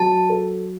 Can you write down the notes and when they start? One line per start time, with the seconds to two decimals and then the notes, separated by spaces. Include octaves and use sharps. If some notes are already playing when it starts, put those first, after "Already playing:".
Already playing: F#3 A5
0.30 A4